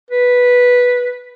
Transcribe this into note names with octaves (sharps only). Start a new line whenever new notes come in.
B4